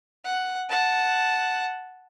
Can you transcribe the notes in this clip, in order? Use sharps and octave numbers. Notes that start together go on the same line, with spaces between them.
F#5
F#5 A5